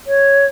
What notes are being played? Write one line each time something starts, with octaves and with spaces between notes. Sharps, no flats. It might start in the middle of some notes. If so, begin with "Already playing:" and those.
C#5